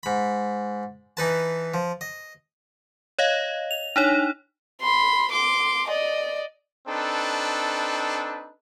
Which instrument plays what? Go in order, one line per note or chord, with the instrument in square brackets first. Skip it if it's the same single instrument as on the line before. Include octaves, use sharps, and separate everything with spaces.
[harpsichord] G#2 B5
E3 D#4 B4 A5
F3
D#5
[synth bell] C#5 D#5 F5
F7
D4 D#4 C#5
[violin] B5 C6
C6 D6
D5 D#5
[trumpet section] C4 D4 D#4 A4 B4